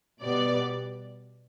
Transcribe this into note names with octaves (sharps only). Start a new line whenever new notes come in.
B2 G3 B3 D5